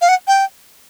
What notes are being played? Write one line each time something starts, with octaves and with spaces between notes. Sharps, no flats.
F5
F#5
G5